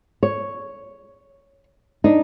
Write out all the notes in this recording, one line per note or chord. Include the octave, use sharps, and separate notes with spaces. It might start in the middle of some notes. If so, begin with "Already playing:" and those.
C#5
D4 D#4